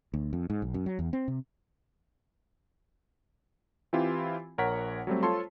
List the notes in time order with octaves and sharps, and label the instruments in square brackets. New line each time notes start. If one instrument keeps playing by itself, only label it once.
[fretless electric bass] D2
F2
G#2
B1
F#2
F#3
E2
C4
C3
[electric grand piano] E3 C4 E4 F4 G4
A#1 A#4 C#5 F#5 B6
F#3 G3 A3 C4
F4 A4 C5 C#5 A5 C6